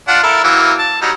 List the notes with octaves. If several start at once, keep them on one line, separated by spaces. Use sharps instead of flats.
D4 F4 F#5
E4 A4 A#4
E3 F#3 A#3
A5
F#3 G3 D#4